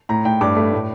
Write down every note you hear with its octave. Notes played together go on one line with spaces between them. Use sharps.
A2 A#5
A2 G5
G2 D6
A3
A2